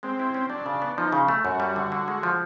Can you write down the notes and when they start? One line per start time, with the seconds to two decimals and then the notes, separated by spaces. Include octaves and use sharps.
0.03 G#3 C4
0.19 E4
0.34 C#4
0.50 F#3 D4
0.66 C#3
0.82 B3
0.98 F3 D#4
1.12 C#3
1.28 A3
1.45 F#2 F#4
1.60 G3
1.76 D3
1.92 D3
2.08 G#3
2.23 F3